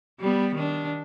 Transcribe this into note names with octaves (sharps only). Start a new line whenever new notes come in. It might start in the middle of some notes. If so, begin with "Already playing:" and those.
G3 B3
D#3 D4